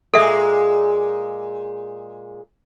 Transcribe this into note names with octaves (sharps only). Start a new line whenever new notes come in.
A#2 G#3 G#4 A4 E5